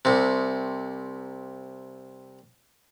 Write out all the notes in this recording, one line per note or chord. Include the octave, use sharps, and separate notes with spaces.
C2 C3